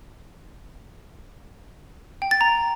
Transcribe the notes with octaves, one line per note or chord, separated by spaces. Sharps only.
G5
A6
A#5